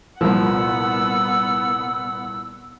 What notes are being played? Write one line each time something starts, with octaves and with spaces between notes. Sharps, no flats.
C2 A#2 F3 B3 F#5 E6